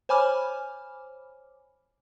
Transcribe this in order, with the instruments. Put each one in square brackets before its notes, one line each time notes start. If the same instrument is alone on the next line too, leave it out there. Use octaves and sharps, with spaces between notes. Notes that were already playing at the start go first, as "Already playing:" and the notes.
[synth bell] C5 C#5 G#5 B5 D6 F6